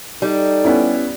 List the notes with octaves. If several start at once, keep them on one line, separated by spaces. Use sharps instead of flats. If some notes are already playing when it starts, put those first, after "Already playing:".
G3 D#4 A4
B3 C#4 E4